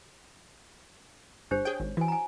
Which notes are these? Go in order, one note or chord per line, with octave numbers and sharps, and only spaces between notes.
G1 D4 G4 C5
G#4 C#5 G5
G#1
E3 F#4 G#5
G#5 A#5